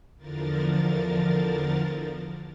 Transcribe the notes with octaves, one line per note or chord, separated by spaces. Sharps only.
E2 D3 F3 A#4 A6